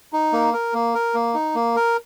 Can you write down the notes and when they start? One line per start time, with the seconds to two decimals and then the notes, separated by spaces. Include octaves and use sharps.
0.13 D#4
0.33 A#3
0.53 A#4
0.74 A#3
0.94 A#4
1.14 A#3
1.34 D#4
1.55 A#3
1.76 A#4